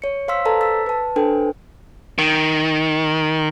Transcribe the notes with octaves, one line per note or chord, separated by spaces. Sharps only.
C#5 C#7
C5 F5 C6 E6 B6
A4 B4 C5 D5 A5 A#5
E6 A6 B6
B4 A5
D4 A4 B4 C5 G5 G#5
D#3